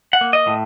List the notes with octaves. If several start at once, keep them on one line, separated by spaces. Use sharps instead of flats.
F#5
A#3
D#5
A2